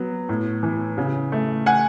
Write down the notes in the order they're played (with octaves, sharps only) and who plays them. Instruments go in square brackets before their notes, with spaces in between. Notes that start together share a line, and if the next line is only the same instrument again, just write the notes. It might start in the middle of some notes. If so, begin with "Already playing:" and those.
Already playing: [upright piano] F#3 B3
A2
E3
C#3
A3
F#5 G#5